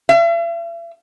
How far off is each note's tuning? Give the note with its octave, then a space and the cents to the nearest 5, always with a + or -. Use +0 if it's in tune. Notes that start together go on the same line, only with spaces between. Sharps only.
E5 +45